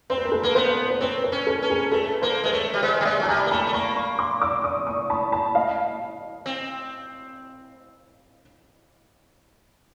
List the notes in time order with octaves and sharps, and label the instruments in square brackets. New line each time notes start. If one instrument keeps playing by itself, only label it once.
[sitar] C4 [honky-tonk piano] C5
[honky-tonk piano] B4
A#4
A4 B4
[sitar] A#3 [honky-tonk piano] B4
[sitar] B3 [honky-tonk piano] A#4 C5
[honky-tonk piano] C5
[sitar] C4 [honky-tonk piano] B4 C#5
[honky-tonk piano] A#4 C5
[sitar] C#4
[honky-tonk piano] A4 B4
[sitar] C#4
[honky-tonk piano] G#4 A#4
[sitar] A3 [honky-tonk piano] A4 B4
[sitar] A#3 [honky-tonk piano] A#4 C5
[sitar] G#3 [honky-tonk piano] C5
[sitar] A3 [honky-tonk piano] B4 C#5
[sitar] G3
[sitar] G#3 [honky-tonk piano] C5 D5
[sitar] G3
[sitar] G#3 [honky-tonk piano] D5 E5
[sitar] F#3
[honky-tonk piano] A5
[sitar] G3 [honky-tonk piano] G#5 A#5
[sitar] A#3
[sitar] A3 [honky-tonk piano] A5 B5
[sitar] A3
[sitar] A#3 [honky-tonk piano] B5 C#6
[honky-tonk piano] B5 C#6
C6 D6
D6 E6
C#6 D#6
C#6 D#6
A5 B5
A5 B5
D#5 F5
[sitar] C4